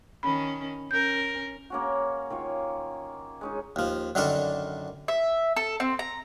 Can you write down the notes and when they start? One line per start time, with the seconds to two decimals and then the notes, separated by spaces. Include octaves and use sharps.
0.23 D#3 C#4 B5
0.91 C#4 A#4 G6
1.70 A#3 C#4 F#4
2.30 D#3 F4 C#5
3.41 G#3 C#4 D#4
3.76 D#2 F3
4.15 F#2 D3 D#3 D4 A4 A#4
5.08 E5
5.56 A4
5.80 C4
5.99 A#5